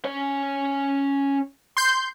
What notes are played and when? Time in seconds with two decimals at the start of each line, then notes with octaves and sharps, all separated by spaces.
0.05 C#4 C#5
1.77 C6 G6